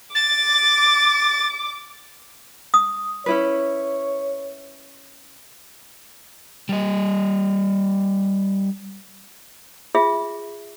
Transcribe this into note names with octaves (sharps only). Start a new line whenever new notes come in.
D6 A6
D#6
C#4 E4 B4 C#5
G3 D#5
F4 G#4 E5